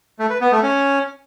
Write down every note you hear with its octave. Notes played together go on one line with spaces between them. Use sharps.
A3
B4
B3
A3
C#4